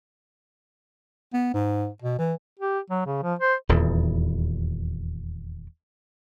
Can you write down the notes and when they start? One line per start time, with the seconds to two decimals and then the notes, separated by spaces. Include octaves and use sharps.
1.34 B3
1.54 G#2
2.02 B2
2.19 E3
2.59 G4
2.90 F#3
3.06 C#3
3.23 F3
3.39 C5
3.69 D#1 E2 E3